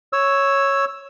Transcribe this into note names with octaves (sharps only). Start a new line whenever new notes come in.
C#5 E6